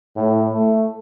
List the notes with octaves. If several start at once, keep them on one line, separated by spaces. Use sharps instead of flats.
A2
A3